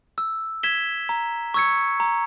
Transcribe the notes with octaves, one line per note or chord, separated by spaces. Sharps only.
E6
G#6 B6 E7 G7
A#5
C#6 E6 G#6 C#7
A#5